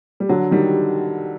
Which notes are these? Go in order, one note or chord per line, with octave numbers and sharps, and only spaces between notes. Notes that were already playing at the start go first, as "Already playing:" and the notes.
G3
D3 F#3
D#3 G3